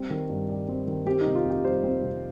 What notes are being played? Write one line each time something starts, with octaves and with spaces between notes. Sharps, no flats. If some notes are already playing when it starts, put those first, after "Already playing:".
Already playing: G3 C4
D#3
G2
G3
C4
D#3
C4 G4
D#4
C3
F4
F2 G4
G3 C5
C4
C3